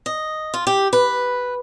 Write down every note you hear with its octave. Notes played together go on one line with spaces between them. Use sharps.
D#5
F4
G4
B4